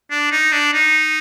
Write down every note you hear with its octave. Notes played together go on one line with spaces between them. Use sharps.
D4
D#4
D4
D#4